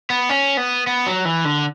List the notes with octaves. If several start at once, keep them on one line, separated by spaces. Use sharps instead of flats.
B3
C#4
B3
B3
F#3
E3
D3